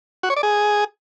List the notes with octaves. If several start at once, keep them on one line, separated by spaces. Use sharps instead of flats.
F#4
C#5
D5
G#4